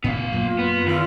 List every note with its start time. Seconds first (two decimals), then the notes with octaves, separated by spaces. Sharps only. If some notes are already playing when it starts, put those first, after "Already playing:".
0.04 A1 A#2 B3 F5
0.32 F#2 F#3 A#3 F4
0.58 B3
0.86 E2 D#3 F4